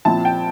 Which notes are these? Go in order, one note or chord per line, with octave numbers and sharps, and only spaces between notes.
A#2 F3 C4 E4 A5
G5